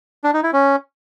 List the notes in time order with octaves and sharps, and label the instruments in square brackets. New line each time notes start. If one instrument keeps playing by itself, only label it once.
[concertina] D4
D#4
E4
C#4